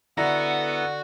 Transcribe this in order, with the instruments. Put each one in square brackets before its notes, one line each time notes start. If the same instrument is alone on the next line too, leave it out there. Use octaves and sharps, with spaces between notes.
[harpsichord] D3 [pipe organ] B3 A4 B4 [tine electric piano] E4 A#5 A#6 [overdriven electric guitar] F#4